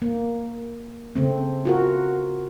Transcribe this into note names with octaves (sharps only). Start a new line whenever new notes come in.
A#3
C#3 A3 C4
F4 F#4 A#4